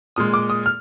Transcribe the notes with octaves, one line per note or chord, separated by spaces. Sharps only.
A#2 G#3 D#6
D6
D#6
F6